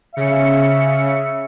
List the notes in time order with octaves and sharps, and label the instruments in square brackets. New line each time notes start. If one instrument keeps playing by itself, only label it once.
[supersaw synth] C#3 C#7 [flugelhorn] E5